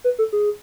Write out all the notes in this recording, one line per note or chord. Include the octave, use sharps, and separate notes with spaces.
B4
A4
G#4